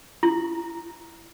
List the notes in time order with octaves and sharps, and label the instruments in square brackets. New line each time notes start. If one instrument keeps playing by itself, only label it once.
[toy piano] E4